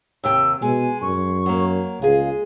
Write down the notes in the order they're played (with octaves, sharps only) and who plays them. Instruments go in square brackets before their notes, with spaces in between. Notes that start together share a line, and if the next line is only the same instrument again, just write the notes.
[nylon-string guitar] D#2 C3 G5 [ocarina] E6
[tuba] B2 [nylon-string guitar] G#3 [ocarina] G#5
[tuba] F#2 [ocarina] C#6
[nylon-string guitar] F#3 A#3
[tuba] C#2 [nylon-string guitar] G#3 G#4 [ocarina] F5